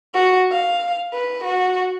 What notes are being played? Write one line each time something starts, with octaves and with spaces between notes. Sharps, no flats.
F#4
F5
B4
F#4